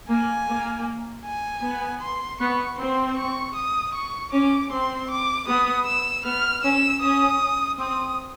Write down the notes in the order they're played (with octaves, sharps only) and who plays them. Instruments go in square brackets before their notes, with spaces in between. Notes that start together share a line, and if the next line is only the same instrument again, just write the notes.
[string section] A#3 [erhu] G#5
[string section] A#3
[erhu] G#5
[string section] B3
[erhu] C6
[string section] B3 [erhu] C#6
[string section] C4 [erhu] C6
[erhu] C#6
D#6
C#6
[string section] C#4 [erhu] D6
[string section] C4 [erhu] C6
[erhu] D6
[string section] B3 [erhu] D#6
[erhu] E6
[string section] B3 [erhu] F6
[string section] C#4 [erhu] E6
[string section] C#4 [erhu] D#6
[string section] C4 [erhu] D#6